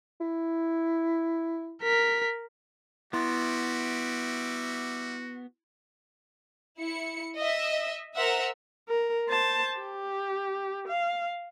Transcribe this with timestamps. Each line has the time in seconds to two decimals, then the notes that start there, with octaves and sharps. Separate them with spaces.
0.20 E4
1.83 A#4 B6
3.13 G3 B3 E4 F#4 E5 C6 D6 A6
6.79 E4 C#7
7.36 D#5 E5
8.16 A#4 C5 E5 F#5
8.89 A#4
9.29 C5 A5
9.78 G4
10.88 F5